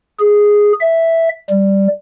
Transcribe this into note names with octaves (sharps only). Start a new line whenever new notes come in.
G#4
E5
G3